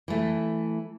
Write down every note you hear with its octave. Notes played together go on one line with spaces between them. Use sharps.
E3 A3